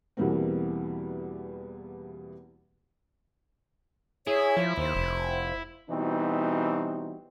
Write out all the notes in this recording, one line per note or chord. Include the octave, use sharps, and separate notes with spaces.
E2 B2 E3 G3 A#3 C4
E4 G#4 C#5
F3
D#2 C5
F1
B2 E3 G3 C4 D#4 F#4